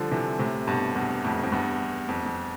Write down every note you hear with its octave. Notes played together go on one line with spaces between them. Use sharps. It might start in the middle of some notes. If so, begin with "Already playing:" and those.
Already playing: D3 F3 G3
C3 E3
A2 C3
G2 B2
E2 G2
F2 A2
F2
E2 G2
F2
F2